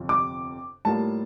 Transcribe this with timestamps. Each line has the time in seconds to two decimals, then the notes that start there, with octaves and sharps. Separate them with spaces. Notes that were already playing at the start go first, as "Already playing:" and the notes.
Already playing: G1 F2 C3 F3
0.09 D6
0.85 A2 G3 A#3 F4 A5